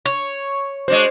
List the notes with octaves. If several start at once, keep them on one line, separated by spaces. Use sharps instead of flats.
C#5
G#3 D4 F#4 C5